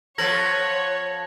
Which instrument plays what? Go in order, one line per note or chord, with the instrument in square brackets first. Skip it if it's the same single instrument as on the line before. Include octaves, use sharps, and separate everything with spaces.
[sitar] F3 B3 A4 [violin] C#5 [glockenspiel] G#6 A#6 F#7